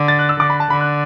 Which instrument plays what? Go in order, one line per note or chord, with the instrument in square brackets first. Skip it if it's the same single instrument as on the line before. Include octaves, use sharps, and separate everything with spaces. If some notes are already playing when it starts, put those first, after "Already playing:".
Already playing: [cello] D3
[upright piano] A6
F#6
E6
[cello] D3 [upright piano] D6
[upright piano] B5
A5
[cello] D3 [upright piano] B5
[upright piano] F#6